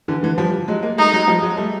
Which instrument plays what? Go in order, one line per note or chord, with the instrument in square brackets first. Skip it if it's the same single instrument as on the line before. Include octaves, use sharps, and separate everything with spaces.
[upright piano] D3 E3
D3 E3
F3 G3
F#3 G#3
G#3 A#3
[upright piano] G3 A3 [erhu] D#4
[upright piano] F#3 G#3
F3 G3
F#3 G#3
G3 A3